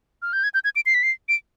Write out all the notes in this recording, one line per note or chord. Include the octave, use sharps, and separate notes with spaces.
F6
G6
G#6
G6
G#6
D7
C7
B6
C7
D7